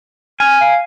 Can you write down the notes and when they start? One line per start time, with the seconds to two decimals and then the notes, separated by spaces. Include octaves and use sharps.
0.40 G#5 F6
0.61 F5